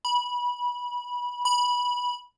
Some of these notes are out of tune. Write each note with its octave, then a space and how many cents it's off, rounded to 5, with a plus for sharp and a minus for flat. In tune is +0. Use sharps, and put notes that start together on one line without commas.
B5 -20
B5 -15